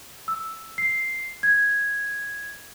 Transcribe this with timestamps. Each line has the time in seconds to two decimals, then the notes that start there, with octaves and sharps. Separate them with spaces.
0.28 E6
0.78 C7
1.43 G#6